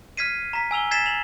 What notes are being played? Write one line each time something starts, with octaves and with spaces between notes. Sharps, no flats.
F6 G#6 B6 C7 D#7
A#5 B6
G#5 E6 F7 G7
G#6 A6 B6 C7 E7
F7 F#7